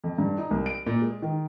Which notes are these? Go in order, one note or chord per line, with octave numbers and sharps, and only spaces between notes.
F2
G2
D#4
C2
D7
A#2
G#3
D#3